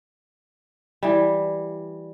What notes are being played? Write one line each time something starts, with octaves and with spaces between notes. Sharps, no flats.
E3 G3